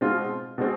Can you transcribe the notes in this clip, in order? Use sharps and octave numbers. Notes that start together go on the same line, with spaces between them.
B2 G#3 C4 F4
B2 G#3 C4